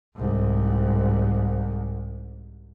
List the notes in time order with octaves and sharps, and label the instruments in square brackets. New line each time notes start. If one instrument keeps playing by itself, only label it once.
[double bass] C2 G#2